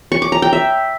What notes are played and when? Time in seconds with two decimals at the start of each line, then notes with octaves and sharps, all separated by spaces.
0.12 C#6
0.22 D6
0.32 A#5
0.42 G5
0.53 E5